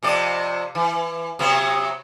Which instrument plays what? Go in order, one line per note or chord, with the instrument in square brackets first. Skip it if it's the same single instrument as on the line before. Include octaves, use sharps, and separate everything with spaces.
[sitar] F2 C3 D5
E3
C3 F#3 B3